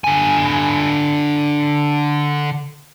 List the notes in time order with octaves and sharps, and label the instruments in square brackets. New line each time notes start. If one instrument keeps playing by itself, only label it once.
[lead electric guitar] D3 G#5